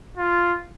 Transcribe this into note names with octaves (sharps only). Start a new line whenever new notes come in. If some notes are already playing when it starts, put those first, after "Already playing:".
F4